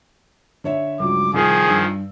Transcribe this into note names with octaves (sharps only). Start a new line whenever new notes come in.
D3 C#5 E5
C#2 G2 F#3 D6
C2 D#3 F3 G#4
G2 E6